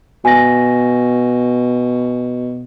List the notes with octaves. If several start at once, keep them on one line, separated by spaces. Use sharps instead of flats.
B2 G#5 A#6